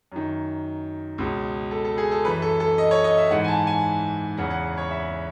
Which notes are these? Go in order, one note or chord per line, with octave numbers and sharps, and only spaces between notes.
F#2 D#3
C#2 B2
A4
A4
G#4
A4
F#2 E3 B4
A4
A4
D#5
C#5
D#5
E5
G#2 E3 F#5
G#5
A5
G#5
E2 C#3 E3 F#5
F#5
C#5
E5